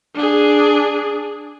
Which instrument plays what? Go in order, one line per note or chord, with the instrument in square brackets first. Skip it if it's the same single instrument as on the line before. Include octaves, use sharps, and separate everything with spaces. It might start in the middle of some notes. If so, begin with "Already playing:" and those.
[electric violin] D4 G#4